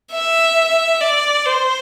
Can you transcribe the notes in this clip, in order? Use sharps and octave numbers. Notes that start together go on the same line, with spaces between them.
E5
D5
C5